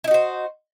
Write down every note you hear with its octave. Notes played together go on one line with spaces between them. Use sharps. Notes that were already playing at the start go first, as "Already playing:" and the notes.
D#4 E4 F#4 C5